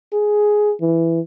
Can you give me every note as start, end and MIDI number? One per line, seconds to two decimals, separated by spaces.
0.13 0.73 68
0.81 1.20 52